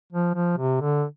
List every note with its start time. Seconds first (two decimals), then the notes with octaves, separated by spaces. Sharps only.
0.12 F3
0.35 F3
0.57 C3
0.81 D3